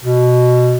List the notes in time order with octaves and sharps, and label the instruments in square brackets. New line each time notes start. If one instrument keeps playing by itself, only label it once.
[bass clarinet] B2